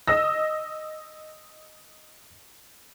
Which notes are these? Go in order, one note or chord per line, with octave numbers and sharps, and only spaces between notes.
D#5 D#6 E6 A#6